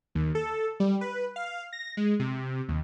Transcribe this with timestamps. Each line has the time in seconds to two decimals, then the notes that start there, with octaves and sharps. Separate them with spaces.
0.15 D#2
0.35 A4
0.80 G3
1.01 B4
1.36 F5
1.73 A#6
1.97 G#3
2.20 C3
2.68 D#2